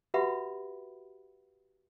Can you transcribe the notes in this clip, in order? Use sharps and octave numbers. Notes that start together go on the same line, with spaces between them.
F#4 G4 B4 E5 F#5 B5